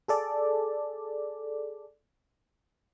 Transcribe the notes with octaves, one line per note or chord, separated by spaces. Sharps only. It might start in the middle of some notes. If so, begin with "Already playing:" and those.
G#4 A4 D5